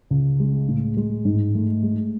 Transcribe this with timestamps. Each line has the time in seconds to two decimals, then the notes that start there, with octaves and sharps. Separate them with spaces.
0.10 C#2
0.40 G#3
0.69 A2
0.97 G#3
1.25 G#2
1.55 A3
1.83 G#3